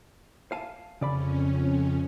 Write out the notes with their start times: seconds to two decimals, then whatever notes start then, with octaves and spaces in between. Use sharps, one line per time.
0.52 F5 G#5 A5
1.01 F2 C#3 C#4 D5 B5